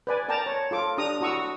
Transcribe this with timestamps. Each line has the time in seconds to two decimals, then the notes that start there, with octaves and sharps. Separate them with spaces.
0.07 B4 D5 G#5
0.29 A#4 D5 G5 A5 A#5
0.46 C#5
0.71 F4 A4 D6
0.98 D4 G4 A#5 D#6
1.20 E4 F#4 A#5 C#6 D#6 E6